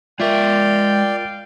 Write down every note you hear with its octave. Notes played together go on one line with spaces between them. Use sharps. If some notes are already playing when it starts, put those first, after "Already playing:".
G#3 F4 A#4 D5 E5 F5 G5